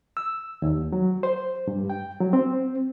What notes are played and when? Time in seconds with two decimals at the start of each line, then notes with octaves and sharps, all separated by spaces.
0.17 E6
0.62 D#2
0.92 F#3
1.23 C5
1.67 G2
1.90 G5
2.20 F#3
2.33 C4